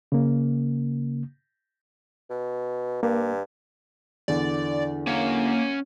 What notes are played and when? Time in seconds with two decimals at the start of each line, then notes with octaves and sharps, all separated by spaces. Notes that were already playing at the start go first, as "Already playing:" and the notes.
0.12 C#3 A#3
2.30 B2
3.03 G2 A#3
4.28 E2 D3 D5
5.07 A#3 C#4 C#5 F#5